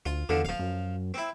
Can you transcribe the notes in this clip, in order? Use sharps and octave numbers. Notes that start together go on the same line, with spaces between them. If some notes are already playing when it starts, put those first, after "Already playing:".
D2 F4
E2 D3 F3
D#1 F3 F5
F#2
C4 E4